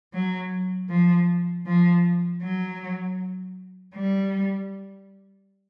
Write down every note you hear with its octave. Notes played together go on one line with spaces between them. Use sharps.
F#3
F3
F3
F#3
G3